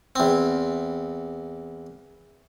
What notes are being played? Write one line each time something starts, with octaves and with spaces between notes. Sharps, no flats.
E2 C4